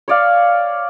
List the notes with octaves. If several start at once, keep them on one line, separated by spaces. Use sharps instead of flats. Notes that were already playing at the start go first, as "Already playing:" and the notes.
C#5 D5 F5